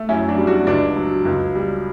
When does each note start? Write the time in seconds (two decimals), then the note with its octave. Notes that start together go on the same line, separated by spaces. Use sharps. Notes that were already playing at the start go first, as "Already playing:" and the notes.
Already playing: A3
0.09 F#2 C#4 E4
0.28 D4 F#4
0.38 G3
0.47 D4 F#4
0.67 C#2 D4
0.96 F#3
1.25 C#2
1.55 G3